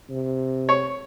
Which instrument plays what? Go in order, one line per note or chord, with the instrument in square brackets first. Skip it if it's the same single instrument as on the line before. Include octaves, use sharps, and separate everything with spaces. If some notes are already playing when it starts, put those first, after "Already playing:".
[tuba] C3
[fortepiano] C#5